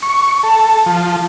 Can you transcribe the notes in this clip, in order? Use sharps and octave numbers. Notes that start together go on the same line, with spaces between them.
C#6
A4
F3